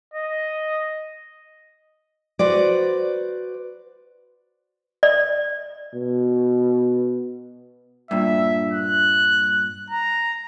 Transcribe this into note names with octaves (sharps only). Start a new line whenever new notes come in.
D#5
F#4 B4 C5 D5
D5
B2
G2 A#2 E5
F#6
A#5